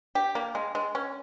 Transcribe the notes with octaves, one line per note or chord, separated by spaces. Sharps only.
G4
A#3
G#3
G#3
C#4